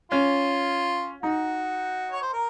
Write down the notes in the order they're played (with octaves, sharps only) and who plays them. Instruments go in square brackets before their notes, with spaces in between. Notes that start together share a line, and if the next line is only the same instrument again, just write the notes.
[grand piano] C#4 [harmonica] F4
[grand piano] D#4 [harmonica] F#4
[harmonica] C#5
C5
A#4